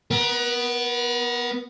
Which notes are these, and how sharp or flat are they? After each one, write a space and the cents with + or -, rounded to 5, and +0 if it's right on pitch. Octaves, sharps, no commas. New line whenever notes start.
B3 +0 A#4 +40